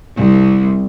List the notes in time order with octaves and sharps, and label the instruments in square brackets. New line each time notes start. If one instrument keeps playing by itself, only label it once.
[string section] C2